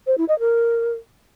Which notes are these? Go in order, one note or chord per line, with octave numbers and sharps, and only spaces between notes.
C5
E4
D#5
A#4